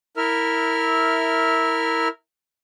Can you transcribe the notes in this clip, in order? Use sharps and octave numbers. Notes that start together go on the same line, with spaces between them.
E4 A#4 E5 F6